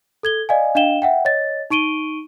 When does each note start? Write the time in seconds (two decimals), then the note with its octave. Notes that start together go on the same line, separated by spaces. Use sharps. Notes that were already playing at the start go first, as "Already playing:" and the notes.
0.23 A4 G#6 G7
0.49 D5 D#5 F5 G#5
0.75 D4 D#5 F5 G5 E7 G7
1.02 E5 F#5 G5
1.25 C#5 D#5 A6
1.70 D#4 C#6 D7 D#7 G7